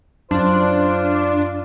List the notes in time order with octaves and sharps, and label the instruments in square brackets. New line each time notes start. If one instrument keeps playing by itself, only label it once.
[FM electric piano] F#2 [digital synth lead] D4 [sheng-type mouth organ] F4 D5 [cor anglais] C5